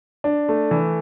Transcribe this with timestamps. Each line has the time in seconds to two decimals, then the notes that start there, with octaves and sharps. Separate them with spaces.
0.24 D4
0.49 A3
0.71 E3